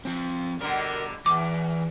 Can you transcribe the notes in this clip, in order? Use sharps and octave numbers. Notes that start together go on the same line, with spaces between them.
F3 C4
B2 D3 G3 A#4 A#5
E2 E3 D6